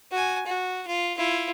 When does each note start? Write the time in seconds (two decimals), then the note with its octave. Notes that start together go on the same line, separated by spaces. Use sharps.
0.11 F#4 G#5
0.46 F#4
0.87 F4
1.17 E4 F4